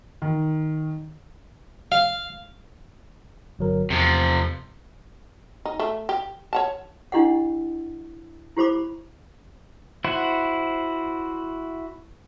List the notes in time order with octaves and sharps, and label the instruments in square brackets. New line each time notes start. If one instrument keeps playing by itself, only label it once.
[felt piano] D#3
[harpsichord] F5
[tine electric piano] G1 F#3 A#4
[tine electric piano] E2 [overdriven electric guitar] C3 F3
[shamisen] D#4
A3
G4
C#5 F#5 A5
[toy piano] D4 E4 G4 D#5 F#5
E4 G4 C5 B5 D6
[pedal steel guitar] E4 F#4 C5 F#5